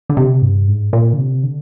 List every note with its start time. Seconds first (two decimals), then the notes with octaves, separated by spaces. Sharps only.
0.10 D3
0.17 C3
0.42 G2
0.68 G#2
0.93 A#2
1.13 D3
1.18 C3
1.43 D3